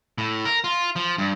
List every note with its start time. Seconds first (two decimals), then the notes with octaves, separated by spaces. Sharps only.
0.18 A2
0.45 A#4
0.64 F4
0.96 F3
1.18 G2